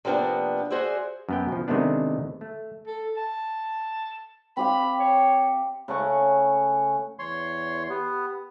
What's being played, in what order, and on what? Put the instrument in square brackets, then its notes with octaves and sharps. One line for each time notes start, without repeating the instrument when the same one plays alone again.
[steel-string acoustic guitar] C3 F3 A#3 B3 C#4 D4
F#4 G#4 C5 D5 E5
[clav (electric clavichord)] F#2 B3 G5
B2 F3
C3 D#3 G#3 A3 B3 D4
A3
[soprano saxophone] A4
A5
[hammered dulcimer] C4 G4 F5 [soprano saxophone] B5
[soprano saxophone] C#5
[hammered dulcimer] C#3 A3 F#5 C#6
[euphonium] E2 [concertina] C#5 C6
[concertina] B3 [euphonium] G4